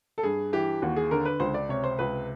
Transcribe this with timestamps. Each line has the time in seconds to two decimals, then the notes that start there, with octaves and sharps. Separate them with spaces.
0.18 A4
0.23 G2 G#4
0.53 E3 G4
0.82 D#2 F#4
0.96 G#4
1.11 D3 A#4
1.25 B4
1.40 C#2 C5
1.54 D5
1.69 C3 C#5
1.84 C5
1.99 C#2 B4